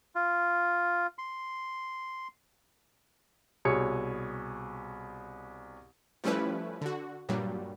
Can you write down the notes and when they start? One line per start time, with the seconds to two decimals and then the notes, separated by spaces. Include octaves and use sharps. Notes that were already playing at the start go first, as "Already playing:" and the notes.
0.15 F4
1.18 C6
3.65 C2 B2 G#4 C#5 C#7
6.24 F3 G3 A3 C#4 E4 B4
6.81 D3 F#4
7.29 G2 A#2 F#3 G3